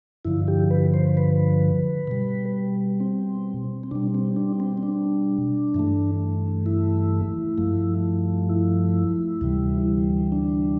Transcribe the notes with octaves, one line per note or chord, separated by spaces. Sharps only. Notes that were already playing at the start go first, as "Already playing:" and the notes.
G2 D3 F3 E4
G4
B4
C5
B4
B2 G3
C4
C4
B2 G3 D4
C4
D4
C4
C4
D4
G2 E3 A3
E4
G2 F3 A3
E4
D2 C3 E3 G3
D4